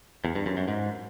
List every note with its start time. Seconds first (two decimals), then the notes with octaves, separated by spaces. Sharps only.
0.25 E2
0.35 G2
0.46 F#2
0.57 F#2
0.68 G#2